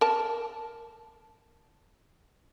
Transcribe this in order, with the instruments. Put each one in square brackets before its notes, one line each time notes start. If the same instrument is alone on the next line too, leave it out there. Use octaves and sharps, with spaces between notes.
[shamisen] A#4 A5